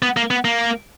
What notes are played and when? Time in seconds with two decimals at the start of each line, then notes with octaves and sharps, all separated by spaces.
0.02 B3
0.17 A#3
0.31 B3
0.45 A#3